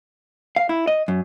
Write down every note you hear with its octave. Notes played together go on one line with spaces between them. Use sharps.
F5
E4
D#5
F#2